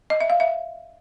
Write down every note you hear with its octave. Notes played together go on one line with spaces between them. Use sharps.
D#5
E5
F5
E5